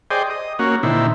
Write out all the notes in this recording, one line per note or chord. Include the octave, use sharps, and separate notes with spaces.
G#4 C5 D5 D#5 G5
D#5
A#3 C#4 F#4
A#2 D3 D#3 C4 E4